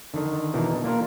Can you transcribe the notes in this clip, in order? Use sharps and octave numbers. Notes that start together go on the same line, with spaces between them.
D3 D#3 D4
B2 E3 D4 D#4 A#4
A#3 D4 F4 A#4